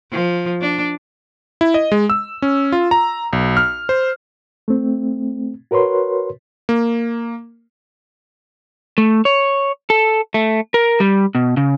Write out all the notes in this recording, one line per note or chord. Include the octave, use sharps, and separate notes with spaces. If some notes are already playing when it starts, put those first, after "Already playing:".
F3
D4
E4
D#5
G#3
E6
C#4
F4
A#5
B1
F6
C5
A3 C4
F#4 A#4 B4 C#5 C6
A#3
A3
C#5
A4
A3
A#4
G3
B2
C#3